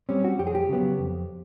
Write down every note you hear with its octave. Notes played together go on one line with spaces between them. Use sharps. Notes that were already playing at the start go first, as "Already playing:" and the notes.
G3 C4 C#4
F#4
F2 G4
G#4
G4
C#3 F#3 B3
F2